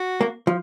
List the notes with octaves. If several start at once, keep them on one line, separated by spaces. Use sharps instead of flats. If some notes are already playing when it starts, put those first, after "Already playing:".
Already playing: F#4
A#3
F3